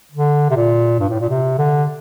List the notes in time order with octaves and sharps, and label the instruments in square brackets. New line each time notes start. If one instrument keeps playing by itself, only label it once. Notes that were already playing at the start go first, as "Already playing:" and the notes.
[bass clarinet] D3
C3
A#2
G2
A2
A#2
C3
D3